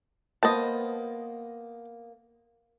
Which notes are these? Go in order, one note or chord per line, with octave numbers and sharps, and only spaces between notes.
A#3 B3 C5 D#5 A5